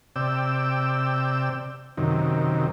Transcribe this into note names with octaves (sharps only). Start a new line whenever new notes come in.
C3 D5 G5 E6
F#2 C3 D#3